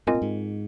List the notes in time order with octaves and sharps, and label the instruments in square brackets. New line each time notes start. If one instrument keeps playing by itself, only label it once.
[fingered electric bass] G#2 [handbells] C4 F4 A#4 D#5 G#5
[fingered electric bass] A#2
G#2